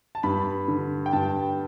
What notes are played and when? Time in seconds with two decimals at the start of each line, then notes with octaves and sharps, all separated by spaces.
0.15 A5
0.23 G2 B5
0.68 D3
1.06 G5
1.13 G2 A5